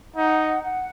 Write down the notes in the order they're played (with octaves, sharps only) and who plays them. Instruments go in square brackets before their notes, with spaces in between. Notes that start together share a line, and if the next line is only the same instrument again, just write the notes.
[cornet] D#4 [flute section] F#5
[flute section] F#5